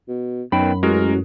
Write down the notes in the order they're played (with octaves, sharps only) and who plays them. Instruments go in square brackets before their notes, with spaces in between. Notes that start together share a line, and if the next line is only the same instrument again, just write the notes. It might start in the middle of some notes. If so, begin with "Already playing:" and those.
[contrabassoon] B2
[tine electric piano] F#2 [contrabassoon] D#3 [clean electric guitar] B3 C#5 G5 [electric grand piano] B5
[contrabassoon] A1 [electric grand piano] G#3 A#4 [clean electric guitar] F#4